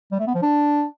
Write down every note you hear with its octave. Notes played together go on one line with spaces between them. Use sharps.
G3
A3
B3
F3
D4